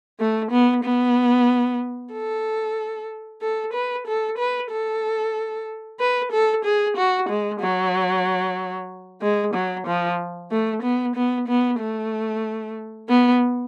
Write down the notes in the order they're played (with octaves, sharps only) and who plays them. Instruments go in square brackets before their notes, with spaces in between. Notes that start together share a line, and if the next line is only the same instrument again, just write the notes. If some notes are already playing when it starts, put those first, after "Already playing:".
[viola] A3
B3
B3
A4
A4
B4
A4
B4
A4
B4
A4
G#4
F#4
G#3
F#3
G#3
F#3
F3
A3
B3
B3
B3
A3
B3